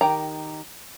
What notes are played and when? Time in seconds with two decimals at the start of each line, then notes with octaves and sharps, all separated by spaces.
0.01 D#3 G4 A#5